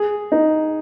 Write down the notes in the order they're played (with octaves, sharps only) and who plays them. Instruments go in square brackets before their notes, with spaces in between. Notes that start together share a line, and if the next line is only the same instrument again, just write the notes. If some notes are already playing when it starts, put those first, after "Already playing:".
Already playing: [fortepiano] G#4
D#4